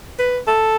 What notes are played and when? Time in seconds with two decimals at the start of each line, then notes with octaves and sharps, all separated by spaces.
0.19 B4
0.47 A4